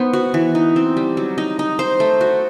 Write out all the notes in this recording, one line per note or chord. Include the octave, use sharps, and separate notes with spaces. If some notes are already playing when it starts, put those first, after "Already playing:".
Already playing: B3 D#4 C5
F#4
E3
D#4
C4
G3
F#3
D#4
D#4
C5
A3
F#4